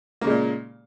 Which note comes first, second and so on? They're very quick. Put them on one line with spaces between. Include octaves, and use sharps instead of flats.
A#3 C#3 G#3 A#2